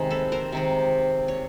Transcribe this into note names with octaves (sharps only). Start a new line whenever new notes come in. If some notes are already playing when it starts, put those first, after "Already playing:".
Already playing: C3 D#3 G#3
A4 B4
A#4 C5
C3 D#3 G#3
C#5